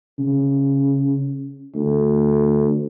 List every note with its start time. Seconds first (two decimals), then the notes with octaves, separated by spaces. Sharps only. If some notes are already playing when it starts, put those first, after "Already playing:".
0.19 C#3
1.74 D2